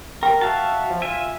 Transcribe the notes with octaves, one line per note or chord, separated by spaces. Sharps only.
A#4 G5
F#4 E5 F5 A5
F3
F4 E5 G#5